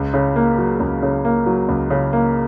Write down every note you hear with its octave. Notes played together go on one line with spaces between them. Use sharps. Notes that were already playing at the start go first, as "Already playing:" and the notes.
Already playing: C#2
C#3
A#3
F#3
C#2
C#3
A#3
F#3
C#2
C#3
A#3